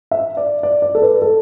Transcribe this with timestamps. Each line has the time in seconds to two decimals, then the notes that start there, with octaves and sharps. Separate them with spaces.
0.11 E5
0.37 D5
0.63 D5
0.82 D5
0.95 A4
1.02 B4
1.22 A4